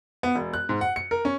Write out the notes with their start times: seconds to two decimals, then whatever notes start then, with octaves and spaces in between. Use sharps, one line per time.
0.23 B3
0.35 E1
0.54 F#6
0.69 G#2
0.81 F#5
0.96 C#7
1.11 A#4
1.25 C#4